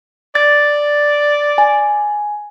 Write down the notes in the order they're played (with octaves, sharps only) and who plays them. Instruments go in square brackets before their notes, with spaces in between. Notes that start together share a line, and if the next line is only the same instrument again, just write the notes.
[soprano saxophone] D5 [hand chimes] A6
[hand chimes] G#5